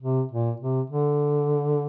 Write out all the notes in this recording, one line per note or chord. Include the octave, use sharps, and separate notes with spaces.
C3
A#2
C3
D3